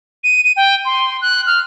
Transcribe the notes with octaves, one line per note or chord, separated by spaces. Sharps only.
D#7
D#7
G5
C6
F#6
F6